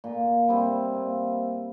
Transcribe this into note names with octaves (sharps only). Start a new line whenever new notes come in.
A#2
G3 C4 E4
A#2